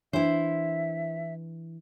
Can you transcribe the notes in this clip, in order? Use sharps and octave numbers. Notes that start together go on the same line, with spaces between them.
E3 D4 E4 C5 E5